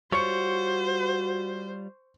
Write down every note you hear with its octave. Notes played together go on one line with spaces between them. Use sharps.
G3 F4 F#4 C5 C#5 C#6 C#7